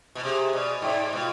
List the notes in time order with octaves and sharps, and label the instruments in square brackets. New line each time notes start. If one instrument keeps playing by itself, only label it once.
[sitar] B2
[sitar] C3 [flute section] G#4
[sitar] B2 [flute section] D5
[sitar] G#2 [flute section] G5
[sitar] B2 [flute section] F4